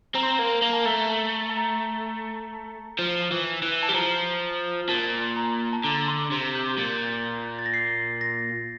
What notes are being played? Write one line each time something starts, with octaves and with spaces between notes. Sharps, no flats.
C4 A#5
C6
A#5
A#3
A#3 A#5
A5
A3 A#5
A5
A5
A#5
F3
E3
E3
A5
G3
F3 A#5
A#2 A5
A#5
A5
D3 A#5
C6
C3
G6
A#2
A6
A#6
C7
A#6